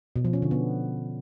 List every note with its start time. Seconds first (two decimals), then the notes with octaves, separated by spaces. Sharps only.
0.16 B2
0.24 F3
0.33 C#4
0.42 D3
0.51 B3